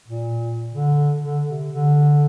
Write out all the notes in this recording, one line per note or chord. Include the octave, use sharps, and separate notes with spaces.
A#2
D3
D3
C3
D3